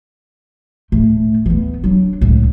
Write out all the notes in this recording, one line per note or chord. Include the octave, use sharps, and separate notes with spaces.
A2 A3
E3 B3
F#3 D4
C#2 A2